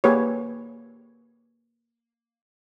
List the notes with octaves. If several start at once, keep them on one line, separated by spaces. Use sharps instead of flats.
A#3 G4 G#4 B4 C#5